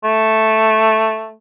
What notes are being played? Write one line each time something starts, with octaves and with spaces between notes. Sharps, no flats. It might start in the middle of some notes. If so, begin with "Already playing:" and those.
A3